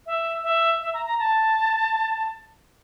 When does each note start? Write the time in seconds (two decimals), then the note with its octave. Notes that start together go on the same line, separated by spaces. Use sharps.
0.06 E5
0.44 E5
0.82 E5
0.94 A#5
1.06 A#5
1.19 A5